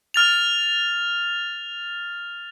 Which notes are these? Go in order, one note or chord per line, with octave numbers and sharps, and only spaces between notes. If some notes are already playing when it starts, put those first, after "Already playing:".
F6 A6 F7